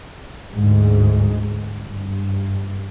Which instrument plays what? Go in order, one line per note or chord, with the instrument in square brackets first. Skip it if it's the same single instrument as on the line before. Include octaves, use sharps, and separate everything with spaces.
[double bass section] D2 G#2 G#3
G2